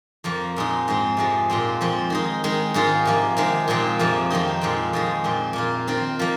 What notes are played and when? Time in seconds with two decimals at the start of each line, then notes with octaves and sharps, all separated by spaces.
0.24 F2 F3 A#3
0.56 A#2 G#3 D#4
0.88 G#2 G#3 C4
1.17 F2 C3 F3 G#3
1.50 A#2 G#3 C4
1.81 F2 F3 C4
2.10 D#3 G#3 D#4
2.44 D#3 G#3 D#4
2.74 G#2 D#3 G#3 F4
3.05 C3 F3 A#3
3.37 C3 D#3 G#3
3.68 A#2 F3 G#3 C4
3.99 F2 C3 F3 A#3
4.30 F2 D#3 C4 D#4
4.61 A#2 F3 G#3 C4
4.93 F2 D#3 G#3
5.24 A#2 F3 C4
5.53 A#2 A#3 F4
5.87 D#3 C4 F4
6.19 F3 A#3